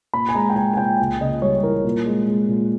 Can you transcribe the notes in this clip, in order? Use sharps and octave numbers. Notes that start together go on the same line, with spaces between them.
A#2 B5
G#5
G#3 A#5
G5
G#3 G#5
G#5
A#2 G5
C#2
C#3 D#5
G3 C#5
E3 A#4
A#2
G#3
G#3
A#2